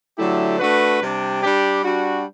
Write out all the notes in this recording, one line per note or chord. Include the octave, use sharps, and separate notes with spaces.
D3 F#3 A3 E4 G4
A3 D4 F#4 B4
C3 G3 D4
G3 D4 G4
G3 D4 F#4